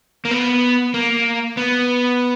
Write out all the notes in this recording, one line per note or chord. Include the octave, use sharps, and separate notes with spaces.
A#3
B3
A#3
B3